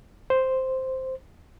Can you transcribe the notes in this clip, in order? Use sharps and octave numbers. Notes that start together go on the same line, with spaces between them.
C5